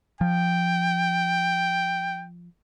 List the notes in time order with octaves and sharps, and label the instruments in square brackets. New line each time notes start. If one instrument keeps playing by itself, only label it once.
[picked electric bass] F3 [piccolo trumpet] G5